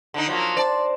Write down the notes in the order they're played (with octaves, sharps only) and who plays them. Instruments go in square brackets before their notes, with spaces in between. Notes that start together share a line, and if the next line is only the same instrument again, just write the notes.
[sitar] D3 D4 D#4
F3 F#3 A#3
[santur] C5 A5 [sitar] D5